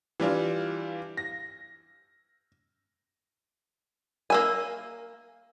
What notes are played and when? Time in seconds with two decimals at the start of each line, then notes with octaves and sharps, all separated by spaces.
0.20 E3 G3 D4 F4
1.17 A#6
4.30 A#3 E5 G#5